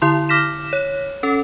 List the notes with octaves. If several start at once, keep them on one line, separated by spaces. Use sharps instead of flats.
D3 E4 C6
D6 F6 A#6 B6 E7
C#5
C#4 A4